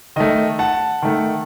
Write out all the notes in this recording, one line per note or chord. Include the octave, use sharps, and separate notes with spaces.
D#3 A3 D#5
F#5 A5
D#3 A3